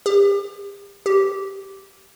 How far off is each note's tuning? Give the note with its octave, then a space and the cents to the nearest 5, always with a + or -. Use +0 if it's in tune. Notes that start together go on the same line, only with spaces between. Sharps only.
G4 +40
G4 -5